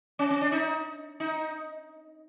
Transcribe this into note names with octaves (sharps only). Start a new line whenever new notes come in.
C#4
C#4
D4
D#4
D#4